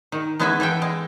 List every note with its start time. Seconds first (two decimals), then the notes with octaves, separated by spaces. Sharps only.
0.12 D#3
0.39 G#3 B3 C#4 E4 E5 G#5
0.60 E3 A4 E5 G5
0.82 G#3